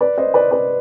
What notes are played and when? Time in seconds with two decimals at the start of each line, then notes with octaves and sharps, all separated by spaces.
0.01 B4 D5
0.18 C5 D#5
0.34 B4 D5
0.51 B4 D5